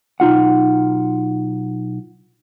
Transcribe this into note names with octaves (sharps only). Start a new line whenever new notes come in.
B1 D#4 F4 F#5